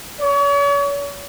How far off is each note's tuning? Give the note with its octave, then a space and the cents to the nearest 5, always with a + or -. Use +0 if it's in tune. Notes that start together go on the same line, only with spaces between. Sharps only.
C#5 +40